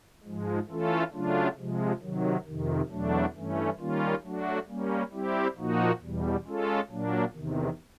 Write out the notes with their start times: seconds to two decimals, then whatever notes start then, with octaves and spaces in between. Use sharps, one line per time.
0.24 G#2 F3 G#3
0.68 E3 A3 C#4 F4 A4
1.13 C#3 F#3 A3 D4 F4
1.57 C3 F3 G#3
2.01 C3 D#3 F#3
2.46 F2 C3 D#3
2.90 E2 B2 F#3 A3 D4
3.35 G2 E3 A3 C#4
3.79 D#3 G3 A#3 C#4 F4
4.23 F#3 A3 D4 F#4
4.68 G3 A#3 C#4
5.12 G3 C4 E4 G4
5.56 A#2 F3 A#3 D#4 F#4
6.01 E2 B2 G3
6.45 G#3 C#4 F4 A4
6.90 A#2 F#3 A#3 D4
7.34 E2 C3 D#3